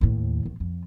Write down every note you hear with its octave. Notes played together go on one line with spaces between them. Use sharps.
D#2 A2
D#2
F2